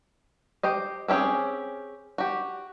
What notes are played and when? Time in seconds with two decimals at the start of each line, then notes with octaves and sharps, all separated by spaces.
0.63 G4 C5 D#5
1.08 C4 C#4 E4 G4 G#4
2.18 F#4 G4